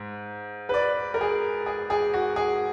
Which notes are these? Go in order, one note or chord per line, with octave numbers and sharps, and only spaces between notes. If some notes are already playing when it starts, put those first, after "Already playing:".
Already playing: G#2
B4
D5
A#4
G#4
G#4
G#4
F#4
G#4